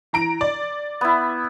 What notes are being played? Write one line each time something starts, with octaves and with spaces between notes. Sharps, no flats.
E3 A#5 D7
D5
B3 E4